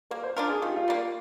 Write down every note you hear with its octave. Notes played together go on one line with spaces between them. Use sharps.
A#3 A#4
C5
D4 F4 A#4
G#4
D#3 F4
G4
F4
G3 A#3